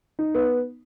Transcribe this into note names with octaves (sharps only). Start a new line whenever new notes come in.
D#4
B3